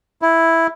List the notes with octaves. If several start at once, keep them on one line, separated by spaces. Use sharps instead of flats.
E4